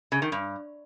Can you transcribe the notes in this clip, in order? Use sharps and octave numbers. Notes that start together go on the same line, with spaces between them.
C#3
D#3
G2